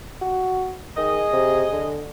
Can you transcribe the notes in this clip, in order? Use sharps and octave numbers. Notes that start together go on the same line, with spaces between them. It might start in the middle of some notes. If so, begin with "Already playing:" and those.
F#4
D#3 G#4 D#5
C3
D3